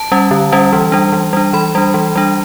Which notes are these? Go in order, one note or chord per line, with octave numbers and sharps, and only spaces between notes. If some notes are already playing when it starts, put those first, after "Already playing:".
Already playing: A5
G3 C#4
D3
G3 C#4
E3
G3 D4
E3
G3 D4
E3 B5
G3 D4
E3
G3 D4